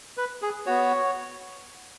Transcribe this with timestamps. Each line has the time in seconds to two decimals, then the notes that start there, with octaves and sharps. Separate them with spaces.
0.17 B4
0.42 G#4
0.66 B3 F#4 C#5